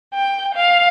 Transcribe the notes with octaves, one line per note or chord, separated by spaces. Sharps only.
G5
F5